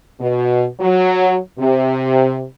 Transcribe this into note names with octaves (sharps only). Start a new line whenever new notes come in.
B2
F#3
C3